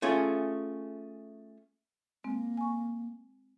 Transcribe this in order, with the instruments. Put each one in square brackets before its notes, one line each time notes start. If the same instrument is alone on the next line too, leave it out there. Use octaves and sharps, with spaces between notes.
[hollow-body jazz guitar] A3 C#4 F4 G#4
[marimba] G#3 C4 [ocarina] A#3
[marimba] G#5 C#6